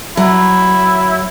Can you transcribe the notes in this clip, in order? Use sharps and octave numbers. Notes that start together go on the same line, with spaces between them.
F#3 E4